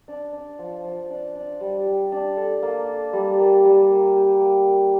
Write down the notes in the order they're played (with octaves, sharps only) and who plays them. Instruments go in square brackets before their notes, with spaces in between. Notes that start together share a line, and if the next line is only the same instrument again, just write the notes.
[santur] D4
D4
F3
F3
D4
D4
G3
G3
D4
A4
A#3
A4
G3
A#3
G3
A#3
G4
A#3
A#3